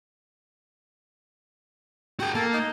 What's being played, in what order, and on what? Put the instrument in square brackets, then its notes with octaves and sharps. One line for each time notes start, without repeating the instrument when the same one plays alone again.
[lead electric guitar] F#4 G#4 [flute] G5
[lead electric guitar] A#3 [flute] A4
[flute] D#4